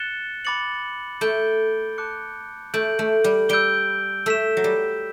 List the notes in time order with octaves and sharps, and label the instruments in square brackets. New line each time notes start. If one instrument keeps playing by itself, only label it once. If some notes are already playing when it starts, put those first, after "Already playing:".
Already playing: [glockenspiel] F#6 A6 C#7 E7 G7
B5 D6 A6 C#7 F#7
[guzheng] A3 [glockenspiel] G6 D7 G7
[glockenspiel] A5 D6 F#6 C#7
[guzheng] A3 [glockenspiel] G6 D7 F#7
[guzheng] A3
G3
[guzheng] G3 [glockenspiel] E6 G6 D7 G7
[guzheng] A3 [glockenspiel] E6 B6 E7
[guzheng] F#3
G3